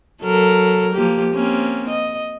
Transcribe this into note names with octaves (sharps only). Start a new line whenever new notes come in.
F#3 A4 A#4
F3 A#3 G4
A#3 C4 C#4
D#5